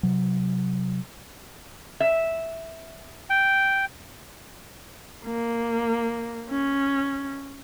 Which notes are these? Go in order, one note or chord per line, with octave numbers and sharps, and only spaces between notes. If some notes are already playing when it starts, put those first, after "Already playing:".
C3 F#3
E5
G5
A#3
C#4